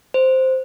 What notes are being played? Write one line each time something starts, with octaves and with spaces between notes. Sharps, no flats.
C5